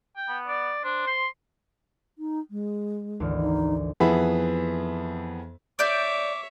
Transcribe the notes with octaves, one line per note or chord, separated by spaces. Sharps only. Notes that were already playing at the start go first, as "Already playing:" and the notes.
G5
B3
D5
D4 C5
C6
D#4
G#3
G#1 D2 E3
D#4
F2 E3 B3 G#4 E5 B5
C#5 D5 E5 D6 G6